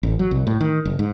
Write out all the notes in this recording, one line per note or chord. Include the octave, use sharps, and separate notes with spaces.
A1
F#3
C2
A2
D#3
F#1
G#2